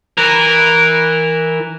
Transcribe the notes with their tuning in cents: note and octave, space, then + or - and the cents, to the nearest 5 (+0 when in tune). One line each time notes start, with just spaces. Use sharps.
E3 -10 A#4 +0